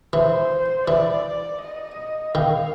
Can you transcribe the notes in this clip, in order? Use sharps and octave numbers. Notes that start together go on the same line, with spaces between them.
E3 C5
E3 D5
D#5
D#3 F5